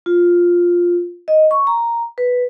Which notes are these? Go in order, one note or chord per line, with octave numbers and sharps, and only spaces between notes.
F4
D#5
C#6
A#5
B4